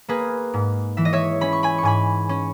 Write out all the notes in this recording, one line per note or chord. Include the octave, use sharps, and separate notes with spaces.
A#3 G#4 B4
G#2
E3 E5
D#5
C#5 E5
C#4 B5
C#6
G#5 B5
C#6
G#2 G#5 B5
C#4